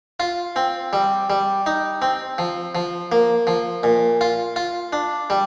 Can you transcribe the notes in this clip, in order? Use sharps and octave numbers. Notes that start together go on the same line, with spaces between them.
F4
C4
G3
G3
D#4
C4
F3
F3
A#3
F3
A#2
F4
F4
D4
G3